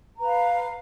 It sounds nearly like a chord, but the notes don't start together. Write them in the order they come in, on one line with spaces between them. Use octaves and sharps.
A#5 B4 F5